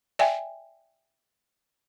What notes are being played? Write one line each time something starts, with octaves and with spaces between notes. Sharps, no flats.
D5 E5 G5 G#5